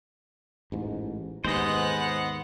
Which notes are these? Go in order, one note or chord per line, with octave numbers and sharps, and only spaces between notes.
A1 G#2
D#2 G#2 G#3 B3 C5 D#5 F#5